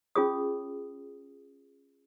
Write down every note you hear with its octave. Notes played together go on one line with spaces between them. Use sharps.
C#4 F4 G#4 C#5 D#6